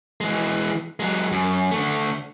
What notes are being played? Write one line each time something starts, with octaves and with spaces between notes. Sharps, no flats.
E3 G#3
F#3 G#3
F#2
D3 A3